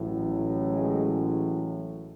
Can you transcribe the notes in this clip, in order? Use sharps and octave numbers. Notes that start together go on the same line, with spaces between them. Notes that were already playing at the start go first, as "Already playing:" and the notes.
Already playing: A1 A2 F#3
G#3